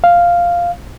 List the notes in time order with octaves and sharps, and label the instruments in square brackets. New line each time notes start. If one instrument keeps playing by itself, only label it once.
[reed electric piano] F5